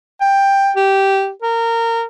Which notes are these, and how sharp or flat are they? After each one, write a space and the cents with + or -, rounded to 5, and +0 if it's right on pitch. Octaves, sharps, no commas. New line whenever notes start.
G5 +10
G4 -10
A#4 -20